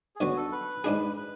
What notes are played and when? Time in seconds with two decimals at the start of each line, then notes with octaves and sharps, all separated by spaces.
0.16 G#4
0.20 D2 D3 F#3 B3 F#4
0.37 A4
0.52 B4
0.84 G#2 G#3 D4 G#4
1.17 B4